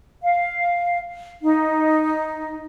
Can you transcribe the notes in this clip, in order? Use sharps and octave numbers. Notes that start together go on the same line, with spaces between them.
F5
D#4